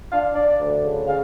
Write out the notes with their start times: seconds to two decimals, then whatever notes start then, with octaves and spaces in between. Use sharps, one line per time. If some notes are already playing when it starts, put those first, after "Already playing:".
0.10 D4 F5
0.35 D4 D5
0.60 D2
0.84 C#3
1.07 C#3 F5